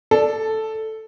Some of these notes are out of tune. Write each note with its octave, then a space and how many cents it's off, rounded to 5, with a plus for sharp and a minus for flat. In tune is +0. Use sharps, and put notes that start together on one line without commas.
A4 +0 D5 +0